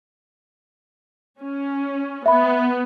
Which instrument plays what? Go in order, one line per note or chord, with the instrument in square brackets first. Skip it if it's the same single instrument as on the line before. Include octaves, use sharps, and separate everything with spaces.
[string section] C#4
[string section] B3 [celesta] E5 B5